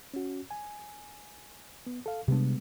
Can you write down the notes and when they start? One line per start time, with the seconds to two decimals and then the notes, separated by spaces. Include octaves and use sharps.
0.14 C#4 F#4
0.51 G#5
1.86 B3
2.06 A4 F5
2.28 C3 G3 G#3 B3 D4